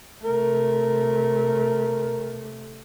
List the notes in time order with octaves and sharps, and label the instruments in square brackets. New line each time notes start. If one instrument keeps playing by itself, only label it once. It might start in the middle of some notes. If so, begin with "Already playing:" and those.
[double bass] C3 A3 [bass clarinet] A#4